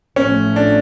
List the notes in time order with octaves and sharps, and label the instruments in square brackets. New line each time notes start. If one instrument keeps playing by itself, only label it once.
[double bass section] A1 A2 F3 A3 [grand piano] C#4
[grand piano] D4